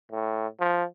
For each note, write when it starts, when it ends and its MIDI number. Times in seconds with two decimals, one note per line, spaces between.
0.12 0.47 45
0.60 0.84 53